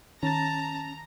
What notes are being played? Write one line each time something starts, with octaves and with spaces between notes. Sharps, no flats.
D#3 C#4 A5 A#5 A6